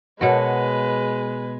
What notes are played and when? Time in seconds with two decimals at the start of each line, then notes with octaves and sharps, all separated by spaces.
0.21 B2 G#3 F#4 A#4 B4 C#5 A5